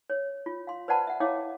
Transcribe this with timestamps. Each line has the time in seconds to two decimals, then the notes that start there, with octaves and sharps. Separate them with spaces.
0.10 C#5
0.46 F4
0.67 F5 C6
0.88 B4 C5 D5 F#5 A5 B5
1.07 E5 F#5
1.20 E4 C#5 E5 F5 G5 D6